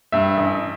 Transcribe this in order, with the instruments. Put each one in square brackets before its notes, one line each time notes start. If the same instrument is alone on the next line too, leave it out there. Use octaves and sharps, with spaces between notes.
[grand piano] G2 E5
A1